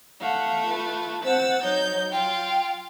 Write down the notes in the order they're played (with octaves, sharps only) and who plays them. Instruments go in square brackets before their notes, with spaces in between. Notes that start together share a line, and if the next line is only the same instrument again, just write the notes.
[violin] A3 [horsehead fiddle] F5 F#5
[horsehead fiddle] F4 B4
[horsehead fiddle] C4 F#5 [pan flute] C5 [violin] E6 A6
[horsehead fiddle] F#3 [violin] D#4 G6 [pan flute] C#5
[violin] F4 [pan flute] G5